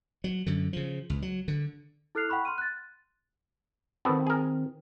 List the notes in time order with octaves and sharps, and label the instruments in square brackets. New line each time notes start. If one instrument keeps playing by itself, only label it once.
[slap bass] F#3
F#2 D3
C#3 F3
C#2
F#3
D3
[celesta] E4 A4 F6 F#6 C7 F7
F#5 G5 B5 C#6 F#6
C6 F6 D#7
F#6 A6
[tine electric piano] D#3 C4 [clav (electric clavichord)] B3 F#4 A4
[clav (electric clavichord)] G#4 A#4